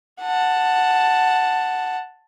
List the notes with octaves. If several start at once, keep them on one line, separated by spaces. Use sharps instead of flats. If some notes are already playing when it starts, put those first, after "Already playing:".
F#5 A5